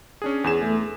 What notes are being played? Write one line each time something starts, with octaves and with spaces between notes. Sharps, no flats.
C#4 D4 G#4
E2 G#4 G#5 E7
A3